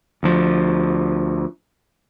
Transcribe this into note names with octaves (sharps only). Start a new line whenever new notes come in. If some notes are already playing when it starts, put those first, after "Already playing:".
D2 F3